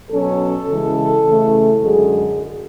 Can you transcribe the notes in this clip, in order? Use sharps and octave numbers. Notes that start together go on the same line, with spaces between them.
B2 F#3 C#4 A4
C#3 E3 G#3
C#3 E3 A3 C#4
F#2 D3 G#3 G#4